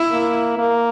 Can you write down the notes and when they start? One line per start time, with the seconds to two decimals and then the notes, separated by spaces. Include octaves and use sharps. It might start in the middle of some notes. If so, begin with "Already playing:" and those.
Already playing: E4
0.11 A#3
0.58 A#3